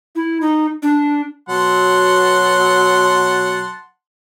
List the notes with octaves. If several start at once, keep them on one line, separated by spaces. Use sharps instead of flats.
E4
D#4
D4
B2 F#3 F#5 A5 C6